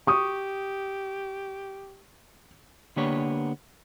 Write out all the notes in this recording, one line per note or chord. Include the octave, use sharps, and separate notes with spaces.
G4 C#6 D#6
D3 A#3 B3 D4 G4 C#5